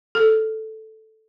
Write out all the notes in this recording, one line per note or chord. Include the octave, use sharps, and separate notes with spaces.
A4